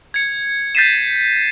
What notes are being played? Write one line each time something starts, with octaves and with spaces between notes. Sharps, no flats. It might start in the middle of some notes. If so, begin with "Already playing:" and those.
G#6 C#7
G6 A6 B6 C7 D#7 E7